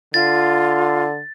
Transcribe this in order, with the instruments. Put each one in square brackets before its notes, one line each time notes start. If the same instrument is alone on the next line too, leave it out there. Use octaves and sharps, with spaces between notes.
[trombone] D3 [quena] F4 [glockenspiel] A6